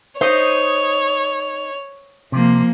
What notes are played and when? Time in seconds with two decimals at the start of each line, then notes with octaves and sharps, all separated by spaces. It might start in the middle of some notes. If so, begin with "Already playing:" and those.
0.21 D#4 C5 C#5 D#5
2.32 C3 F3 A#3